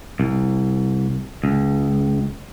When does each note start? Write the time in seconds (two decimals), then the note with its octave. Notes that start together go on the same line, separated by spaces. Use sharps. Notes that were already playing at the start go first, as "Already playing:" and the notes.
0.20 C2
1.44 C#2